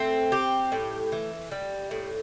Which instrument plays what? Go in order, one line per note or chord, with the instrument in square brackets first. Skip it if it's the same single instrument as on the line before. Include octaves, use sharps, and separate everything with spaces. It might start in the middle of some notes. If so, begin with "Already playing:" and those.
Already playing: [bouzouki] A3 C4
G4
A2
E3
G3
A2